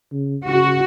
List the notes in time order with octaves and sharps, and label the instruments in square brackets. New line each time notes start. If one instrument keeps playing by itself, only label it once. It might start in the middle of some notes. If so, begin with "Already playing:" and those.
[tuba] C#3
[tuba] C#3 [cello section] F#4